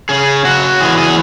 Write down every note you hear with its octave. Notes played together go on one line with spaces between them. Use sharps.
C#3 G#4
F#3 F#4
E3 G#4
G#4